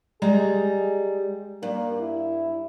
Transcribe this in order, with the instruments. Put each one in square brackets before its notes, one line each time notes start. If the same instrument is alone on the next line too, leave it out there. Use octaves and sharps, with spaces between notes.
[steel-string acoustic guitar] G3 G#3 A#5 [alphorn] G#4
[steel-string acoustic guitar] G2 [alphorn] A#3
[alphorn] E4